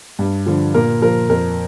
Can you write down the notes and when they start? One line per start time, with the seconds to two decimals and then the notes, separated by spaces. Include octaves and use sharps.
0.19 G2
0.46 D3 F3
0.74 A#2 A#4
1.02 F3 A#4
1.29 F2 A#4